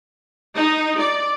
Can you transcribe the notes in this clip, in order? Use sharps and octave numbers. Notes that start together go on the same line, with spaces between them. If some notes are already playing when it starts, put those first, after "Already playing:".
D#4
D5